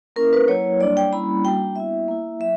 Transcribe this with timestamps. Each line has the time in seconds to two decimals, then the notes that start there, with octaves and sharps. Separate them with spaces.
0.16 A#3 C#4 E4 A#4
0.33 B4
0.48 F#3 A#3 E4 C#5
0.80 G3 A#3 D4 D5
0.97 G5
1.12 G3 A#3 C#4 E4 B5
1.44 G3 A#3 D4 F#4 G5
1.76 B3 E4 E5
2.08 A#3 E4
2.40 F#3 E5